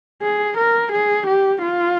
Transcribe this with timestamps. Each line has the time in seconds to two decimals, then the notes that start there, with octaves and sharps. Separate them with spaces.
0.22 G#4
0.57 A#4
0.92 G#4
1.27 G4
1.62 F4